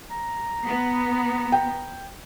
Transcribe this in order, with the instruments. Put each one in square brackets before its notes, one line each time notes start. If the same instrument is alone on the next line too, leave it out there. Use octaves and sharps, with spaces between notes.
[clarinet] A#5
[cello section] B3
[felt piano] G5